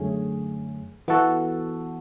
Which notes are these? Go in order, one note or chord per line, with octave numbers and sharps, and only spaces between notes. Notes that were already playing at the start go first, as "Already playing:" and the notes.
Already playing: F#2 D3 A3 C#4 G#4
E3 B3 F#4 A4